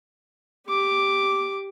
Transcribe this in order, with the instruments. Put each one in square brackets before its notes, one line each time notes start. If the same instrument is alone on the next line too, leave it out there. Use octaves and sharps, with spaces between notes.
[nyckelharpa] G4 D6